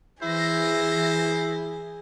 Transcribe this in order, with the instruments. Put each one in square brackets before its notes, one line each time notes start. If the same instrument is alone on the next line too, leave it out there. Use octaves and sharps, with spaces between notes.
[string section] E3 A#6 [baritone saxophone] E4 [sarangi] G#4 [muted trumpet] C5